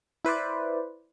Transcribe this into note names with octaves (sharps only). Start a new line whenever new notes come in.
E4 B4 C5 D5